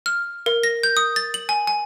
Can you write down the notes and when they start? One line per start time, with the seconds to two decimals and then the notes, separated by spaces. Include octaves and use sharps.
0.06 F6
0.46 A#4
0.63 A#6
0.83 G6
0.97 D#6
1.16 A6
1.34 F#7
1.49 G#5
1.67 G#5